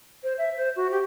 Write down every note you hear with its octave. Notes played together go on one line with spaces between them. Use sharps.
C5
E5
C5
F#4
G4